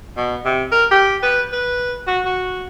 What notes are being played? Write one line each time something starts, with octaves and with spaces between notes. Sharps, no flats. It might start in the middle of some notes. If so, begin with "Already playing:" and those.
B2
C3
A#4
G4
B4
B4
F#4
F#4